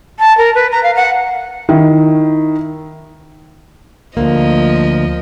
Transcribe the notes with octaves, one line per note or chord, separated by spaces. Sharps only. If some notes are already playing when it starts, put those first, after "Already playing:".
A5
A#4
B4
A#5
F5
F#5
D#3 E4
D2 F3 A#3 D#5